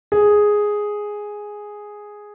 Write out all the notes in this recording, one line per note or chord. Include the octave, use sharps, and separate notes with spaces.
G#4